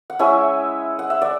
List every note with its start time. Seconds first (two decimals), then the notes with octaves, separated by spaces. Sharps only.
0.10 F#5
0.19 G#3 C#4 E4 E5 G#5
0.99 F#5
1.10 E5
1.22 D5 F#5